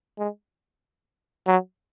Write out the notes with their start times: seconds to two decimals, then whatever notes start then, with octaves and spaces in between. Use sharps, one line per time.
0.18 G#3
1.47 F#3